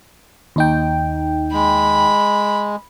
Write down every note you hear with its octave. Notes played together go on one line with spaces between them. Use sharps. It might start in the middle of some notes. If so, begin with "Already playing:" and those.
D#2 D#4 G5
G#3 B5